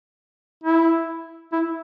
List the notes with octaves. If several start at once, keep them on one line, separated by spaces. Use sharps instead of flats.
E4
E4